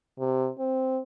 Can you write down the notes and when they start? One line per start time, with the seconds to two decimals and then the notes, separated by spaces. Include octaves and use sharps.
0.19 C3
0.59 C4